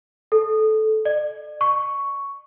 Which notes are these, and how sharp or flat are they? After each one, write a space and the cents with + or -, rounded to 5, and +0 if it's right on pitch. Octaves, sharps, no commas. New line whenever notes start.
A4 -15
D5 +40
C#6 +5